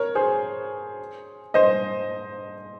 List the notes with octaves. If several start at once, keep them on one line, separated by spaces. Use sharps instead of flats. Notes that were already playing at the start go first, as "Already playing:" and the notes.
Already playing: A#4 C#5
G#4 C5
C5 D#5